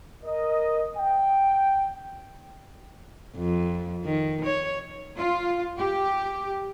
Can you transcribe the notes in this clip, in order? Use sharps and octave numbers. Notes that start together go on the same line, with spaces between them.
A#4 D#5
G5
F2
D#3
C#5
F4
G4